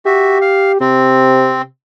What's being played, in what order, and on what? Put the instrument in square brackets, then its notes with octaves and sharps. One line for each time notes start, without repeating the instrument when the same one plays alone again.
[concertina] F#4 E5 [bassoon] G4
[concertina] F5
[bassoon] C3 [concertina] C4